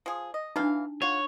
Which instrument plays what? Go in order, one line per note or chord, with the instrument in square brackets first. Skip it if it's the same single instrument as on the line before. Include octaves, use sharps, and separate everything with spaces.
[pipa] F3 G#4
D#5
[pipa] E3 F#3 F5 [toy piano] D4 D#4
[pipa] F4 F#5 [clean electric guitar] C#5